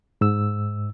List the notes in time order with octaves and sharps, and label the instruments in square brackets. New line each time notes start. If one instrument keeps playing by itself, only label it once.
[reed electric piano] G#2 E6